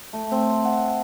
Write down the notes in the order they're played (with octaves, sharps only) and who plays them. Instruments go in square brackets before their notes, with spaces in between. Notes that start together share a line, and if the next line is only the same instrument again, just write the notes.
[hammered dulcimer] A3
C4
F#5